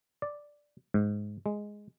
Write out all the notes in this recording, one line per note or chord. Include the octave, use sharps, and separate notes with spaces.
D5
G#2
G#3